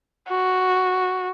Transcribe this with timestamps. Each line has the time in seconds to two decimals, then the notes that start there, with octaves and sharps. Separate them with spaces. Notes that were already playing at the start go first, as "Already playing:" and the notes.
0.28 F#4